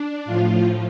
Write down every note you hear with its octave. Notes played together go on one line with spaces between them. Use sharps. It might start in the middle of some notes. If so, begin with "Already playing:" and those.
Already playing: D4
A2 F3 F4